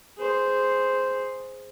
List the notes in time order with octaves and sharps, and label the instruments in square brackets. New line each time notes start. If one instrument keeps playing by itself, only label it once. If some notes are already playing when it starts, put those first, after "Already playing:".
[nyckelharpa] G#4 C5